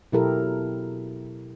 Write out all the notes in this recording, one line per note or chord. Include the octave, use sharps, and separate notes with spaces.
B2 F#3 E4 G4 A4 A#4